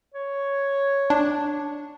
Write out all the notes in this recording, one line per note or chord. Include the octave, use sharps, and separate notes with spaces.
C#5
D4